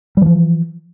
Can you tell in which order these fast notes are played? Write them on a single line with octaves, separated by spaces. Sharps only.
G3 E3 F3